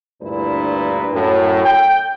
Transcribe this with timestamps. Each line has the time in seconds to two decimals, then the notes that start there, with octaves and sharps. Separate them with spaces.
0.22 D2 G2 A#2 E4 B4
1.13 F#2 A2
1.65 G5